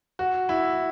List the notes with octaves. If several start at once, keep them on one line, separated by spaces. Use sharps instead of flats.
F#4
E4